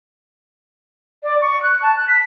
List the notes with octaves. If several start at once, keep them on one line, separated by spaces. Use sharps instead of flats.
D5
C#6
F#6
A5
F#6
B6